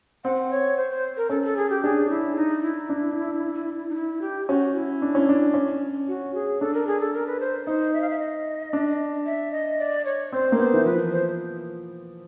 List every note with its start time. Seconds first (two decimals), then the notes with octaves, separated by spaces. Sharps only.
0.24 C4 F#5
0.51 C#5
0.77 C5
0.90 C5
1.17 A#4
1.29 C#4 A4
1.44 A4
1.57 G#4
1.70 G4
1.84 D4 G#4
2.09 E4
2.36 D#4
2.63 E4
2.89 D4
3.89 D#4
3.95 E4
4.22 G4
4.48 C#4 F#4
4.75 E4
5.02 D4
5.15 C#4
5.29 D4
5.54 C#4
6.08 F#4
6.35 G#4
6.61 D4 A4
6.74 A#4
6.87 G#4
7.00 A4
7.14 A#4
7.27 B4
7.40 C5
7.67 D#4 C5
7.93 E5
8.01 F5
8.10 E5
8.19 D#5
8.73 D4
9.26 E5
9.52 D#5
9.79 D5
10.05 C#5
10.32 C4 C5
10.52 A#3
10.58 B3 C5
10.74 E3
10.85 F3 B4
11.11 C5